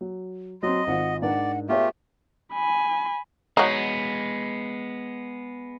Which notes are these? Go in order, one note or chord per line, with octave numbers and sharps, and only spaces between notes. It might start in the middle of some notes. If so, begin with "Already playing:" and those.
F#3
F#3 C4 D#5 C6
G#1 F4 F#5
G#2 D4 A#4 D5 F#5
A3 B3 F4 G4 G#4 C#5 E5
G#5 B5
F#3 G#3 B3 D#4